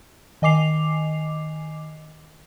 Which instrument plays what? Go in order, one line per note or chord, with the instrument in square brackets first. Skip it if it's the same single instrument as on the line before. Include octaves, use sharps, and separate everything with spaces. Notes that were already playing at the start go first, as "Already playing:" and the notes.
[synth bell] D#3 D#5 G#5 D6 C7 F7